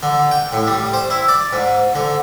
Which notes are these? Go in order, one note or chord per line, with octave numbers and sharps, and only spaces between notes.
D3
G5
A2
G3
C5
E4
D5
G#2
D3